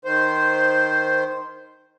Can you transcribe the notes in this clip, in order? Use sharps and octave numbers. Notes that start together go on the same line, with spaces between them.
D#3 C5